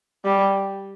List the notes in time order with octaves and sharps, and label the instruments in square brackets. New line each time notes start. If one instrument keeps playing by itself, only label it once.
[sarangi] G3